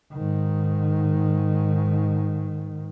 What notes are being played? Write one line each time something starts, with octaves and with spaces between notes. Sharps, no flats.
G#2 D#3